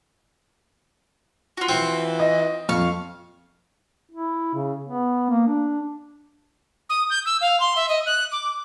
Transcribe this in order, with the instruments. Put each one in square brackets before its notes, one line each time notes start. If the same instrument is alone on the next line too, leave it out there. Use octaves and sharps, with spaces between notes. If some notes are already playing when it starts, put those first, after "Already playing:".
[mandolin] F4 F#4
[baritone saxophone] E3 [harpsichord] C4
[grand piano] D#5
[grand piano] F2 [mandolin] F5 C#6
[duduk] E4
C#3
B3
A#3
D4
[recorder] D#6
G6
E6
F5
C6
E5
D#5
F#6
D6